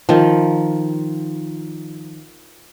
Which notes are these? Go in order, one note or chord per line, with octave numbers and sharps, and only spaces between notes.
D#3 F3